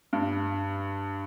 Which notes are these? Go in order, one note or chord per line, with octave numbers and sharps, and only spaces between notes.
G2